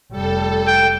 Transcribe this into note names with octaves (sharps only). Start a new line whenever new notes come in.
F1 G3 A4
G5